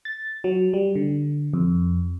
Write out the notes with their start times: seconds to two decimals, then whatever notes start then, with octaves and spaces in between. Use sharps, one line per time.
0.05 A6
0.44 F#3
0.74 G3
0.95 D3
1.53 F2